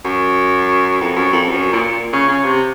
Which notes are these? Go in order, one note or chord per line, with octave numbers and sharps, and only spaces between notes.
F#2
F2
F#2
F2
F#2
A#2
C#3
C#3
C3